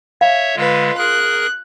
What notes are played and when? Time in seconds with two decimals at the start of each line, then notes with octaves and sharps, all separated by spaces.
0.21 C#5 E5 F5
0.56 D3 G#3 F4 B4
0.98 G#4 A#4 F#6